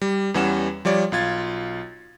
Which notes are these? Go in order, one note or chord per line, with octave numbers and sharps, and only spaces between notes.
G3
E2 E3 G3 C#4 F#5 E7
F3 G3 C#5 D5
B1 F4 G#6 A6